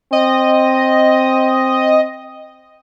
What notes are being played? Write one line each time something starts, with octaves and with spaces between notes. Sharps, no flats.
C4 D#5